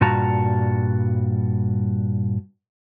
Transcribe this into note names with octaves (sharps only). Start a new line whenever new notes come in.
G2 A#2 G3 F#4 A5 A#5